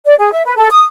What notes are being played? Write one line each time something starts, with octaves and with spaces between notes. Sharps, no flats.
D5
G#4
E5
B4
A4
D#6